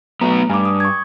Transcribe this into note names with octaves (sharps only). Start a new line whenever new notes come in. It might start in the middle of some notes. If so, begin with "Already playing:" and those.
F#3 A3 B3 A#5
G2 G#5 D6
D#6
C#6 G#6